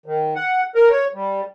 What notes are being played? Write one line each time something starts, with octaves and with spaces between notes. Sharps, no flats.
D#3
F#5
A#4
C#5
G3